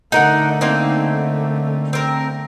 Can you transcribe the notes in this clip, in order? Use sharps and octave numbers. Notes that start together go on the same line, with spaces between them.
D3 A3 D#4 A#4 F#5
A#3 C4 D#4
C4 A#4